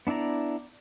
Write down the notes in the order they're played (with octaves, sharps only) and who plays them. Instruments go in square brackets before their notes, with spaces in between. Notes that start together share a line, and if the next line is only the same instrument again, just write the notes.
[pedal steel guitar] B3 D4 E4 D5 A#5